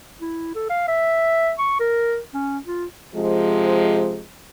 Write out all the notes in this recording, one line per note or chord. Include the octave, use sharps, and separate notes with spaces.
E4
A4
F5
E5
C#6
A#4
C#4
F4
C3 F3 G#3